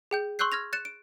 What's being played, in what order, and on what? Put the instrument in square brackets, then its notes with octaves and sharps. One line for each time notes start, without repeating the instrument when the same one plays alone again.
[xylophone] G#4 G5 G6
C6 C#6 E6 F#6 G6 C7
F6 G#6 A#6 F7
F#6 A6 C#7 E7
D7